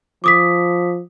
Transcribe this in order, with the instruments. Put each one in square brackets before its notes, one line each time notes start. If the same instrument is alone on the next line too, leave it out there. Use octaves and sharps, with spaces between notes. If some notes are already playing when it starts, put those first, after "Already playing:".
[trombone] F3 [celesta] D6 D#6 B6